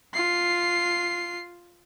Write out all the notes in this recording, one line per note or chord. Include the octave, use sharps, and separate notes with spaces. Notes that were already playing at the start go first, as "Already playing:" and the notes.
F4 C7